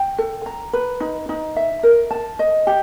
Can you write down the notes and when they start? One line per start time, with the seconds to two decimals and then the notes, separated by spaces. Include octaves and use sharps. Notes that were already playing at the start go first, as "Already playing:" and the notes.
Already playing: G5
0.18 A4
0.46 A#5
0.73 B4
1.00 D#4
1.29 D#4
1.56 E5
1.83 A#4
2.11 A5
2.39 D#5
2.67 G4